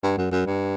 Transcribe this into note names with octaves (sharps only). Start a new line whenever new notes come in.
G2
F#2
F#2
G2